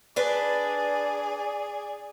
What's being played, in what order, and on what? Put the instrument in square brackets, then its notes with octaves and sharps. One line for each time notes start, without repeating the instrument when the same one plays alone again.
[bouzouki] D4 B4 [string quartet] G#4 D5